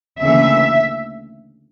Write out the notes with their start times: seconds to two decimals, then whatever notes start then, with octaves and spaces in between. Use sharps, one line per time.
0.21 D2 C#3 E3 A#3 C#4 E5